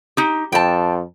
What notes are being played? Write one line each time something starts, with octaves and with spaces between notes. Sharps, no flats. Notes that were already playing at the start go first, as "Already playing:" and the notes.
D#4 G4
F2 G5 A5